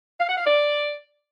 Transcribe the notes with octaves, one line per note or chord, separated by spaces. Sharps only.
F5
F#5
F5
D5